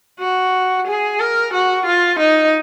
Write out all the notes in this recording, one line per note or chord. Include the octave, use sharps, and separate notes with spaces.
F#4
G#4
A#4
F#4
F4
D#4